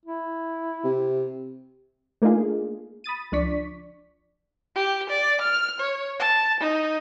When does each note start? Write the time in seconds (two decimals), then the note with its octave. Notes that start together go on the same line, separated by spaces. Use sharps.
0.05 E4
0.84 C3
2.22 A3 A#3 D4 D#4 F4 G#4
3.04 B5 D#6 A6 D#7
3.32 C#2 F3 D4 D5 C#6 B6
4.75 G4
5.09 D5
5.41 F6
5.80 C#5
6.19 A5
6.60 D#4